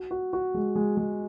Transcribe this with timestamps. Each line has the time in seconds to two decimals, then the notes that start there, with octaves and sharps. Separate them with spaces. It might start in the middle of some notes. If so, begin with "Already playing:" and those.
Already playing: F#4
0.11 F#4
0.33 F#4
0.54 G#3
0.76 G#3
0.97 G#3